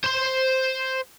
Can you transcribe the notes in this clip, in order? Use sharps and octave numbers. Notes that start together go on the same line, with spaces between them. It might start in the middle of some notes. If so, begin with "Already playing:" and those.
C5 C6